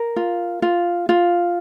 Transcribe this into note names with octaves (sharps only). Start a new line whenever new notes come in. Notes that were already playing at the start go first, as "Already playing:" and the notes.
Already playing: A#4
F4
F4
F4